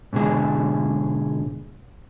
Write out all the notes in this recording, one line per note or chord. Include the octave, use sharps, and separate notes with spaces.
G#2 B2 D3 G#4